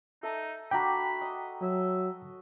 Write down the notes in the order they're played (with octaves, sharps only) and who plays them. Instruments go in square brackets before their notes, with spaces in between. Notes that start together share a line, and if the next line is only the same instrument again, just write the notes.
[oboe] D#4 [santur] A4 E5
[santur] D4 F#4 [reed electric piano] G5 A#5 [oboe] B5
[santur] D#5
[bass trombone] F#3 [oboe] E5